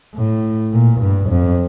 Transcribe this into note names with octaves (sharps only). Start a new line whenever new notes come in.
A2
A#2
G2
F2